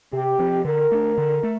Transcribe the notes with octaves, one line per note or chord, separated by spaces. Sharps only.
C3 G4
F3 C4
D3 A#4
A3 D4
D3
A3